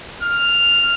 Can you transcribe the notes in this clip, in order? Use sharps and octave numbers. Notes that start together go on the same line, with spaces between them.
F6